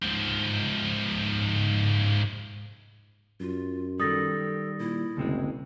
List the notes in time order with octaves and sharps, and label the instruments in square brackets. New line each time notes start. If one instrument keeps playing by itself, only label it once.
[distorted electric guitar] G#2 F3
[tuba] F#2 [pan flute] F4
[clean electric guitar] D#3 G3 [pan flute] A4 [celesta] D#6 A6 A#6
[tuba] A#2 [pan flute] E4
[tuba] F#1 [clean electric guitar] D2 C3 G#3